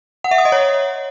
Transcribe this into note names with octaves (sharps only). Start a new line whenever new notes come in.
F#5
E5
D#6
D#5
C#5